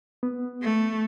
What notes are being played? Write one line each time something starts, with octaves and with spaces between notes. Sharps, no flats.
B3
A3